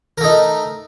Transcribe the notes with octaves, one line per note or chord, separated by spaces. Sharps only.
A3 D#4 A#4